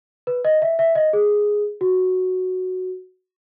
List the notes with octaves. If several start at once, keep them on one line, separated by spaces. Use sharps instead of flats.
B4
D#5
E5
E5
D#5
G#4
F#4